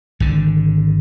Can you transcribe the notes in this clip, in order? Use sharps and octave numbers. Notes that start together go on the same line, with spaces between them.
G#1 D3